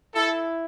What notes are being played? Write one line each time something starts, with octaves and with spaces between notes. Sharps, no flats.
E4 A4